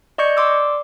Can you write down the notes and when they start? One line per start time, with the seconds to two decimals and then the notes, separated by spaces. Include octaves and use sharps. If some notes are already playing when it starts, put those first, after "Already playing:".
0.18 D5 D#5 C#6 G6 G#6 C#7
0.37 D5 C6 D6 E6